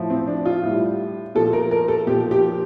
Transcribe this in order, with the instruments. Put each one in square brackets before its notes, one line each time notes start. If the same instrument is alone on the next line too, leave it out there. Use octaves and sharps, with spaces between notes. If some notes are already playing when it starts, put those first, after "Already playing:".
Already playing: [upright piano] A2 F3
C4
D4
F4
A2 G3
A#2 F3 A4
A#4
A#4
A4
A#2 F3 G4
G4